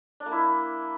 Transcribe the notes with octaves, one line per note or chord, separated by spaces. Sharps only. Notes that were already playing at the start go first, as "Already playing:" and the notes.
D4
A#3
E4